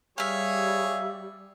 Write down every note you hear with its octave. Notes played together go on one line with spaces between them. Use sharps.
G3 G#4 C#5 E5 F5